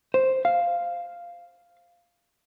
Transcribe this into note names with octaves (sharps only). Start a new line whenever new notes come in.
C5
F5